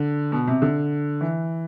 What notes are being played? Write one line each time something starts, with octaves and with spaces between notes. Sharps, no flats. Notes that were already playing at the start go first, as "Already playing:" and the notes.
Already playing: D3
B2
C3
D3
E3